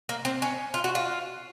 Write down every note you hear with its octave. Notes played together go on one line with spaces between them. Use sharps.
A#3
C4
C#4
F4
F#4
F4